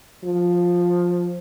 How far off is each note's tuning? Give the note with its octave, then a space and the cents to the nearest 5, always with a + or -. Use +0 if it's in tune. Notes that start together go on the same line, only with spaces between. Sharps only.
F3 +10